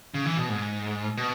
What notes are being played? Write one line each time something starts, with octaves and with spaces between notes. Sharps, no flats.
C#3
E3
B2
G#2
B2